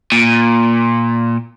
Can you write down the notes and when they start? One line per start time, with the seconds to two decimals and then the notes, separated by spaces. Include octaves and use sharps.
0.12 A#2